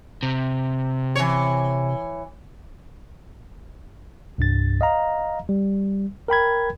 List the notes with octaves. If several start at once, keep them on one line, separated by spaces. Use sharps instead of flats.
C3
E3 C#5
C2 G2 A6
D#5 F5 A#5
G3
A#4 G5 B5 G#6